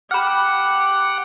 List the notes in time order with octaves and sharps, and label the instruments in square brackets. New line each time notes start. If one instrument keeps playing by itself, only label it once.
[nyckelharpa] G4 D6 [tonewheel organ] F#5 [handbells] B5 F6